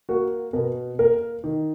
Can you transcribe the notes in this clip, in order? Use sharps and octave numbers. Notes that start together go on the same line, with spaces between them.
A#3 F#4
B2 A#4
A#3 A#4
D#3